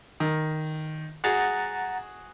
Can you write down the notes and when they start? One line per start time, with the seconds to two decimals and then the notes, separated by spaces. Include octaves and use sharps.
0.20 D#3
1.24 F#4 G#4 F#5 A#5 A6